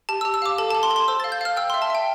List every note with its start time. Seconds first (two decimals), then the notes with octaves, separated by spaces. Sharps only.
0.09 G4 A5
0.21 E6
0.25 G4
0.34 E6
0.42 F5 D6
0.58 A4 A5
0.71 A4 A5
0.83 C6
0.91 A4
0.96 C6
1.08 C5 E6
1.20 F5 A6
1.32 G6
1.41 F5 F6
1.57 G5 E6
1.70 E5 C6
1.82 A5
1.90 E5 G5